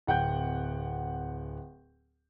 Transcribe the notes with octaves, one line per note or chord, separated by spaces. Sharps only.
D1 F#5 G5 G6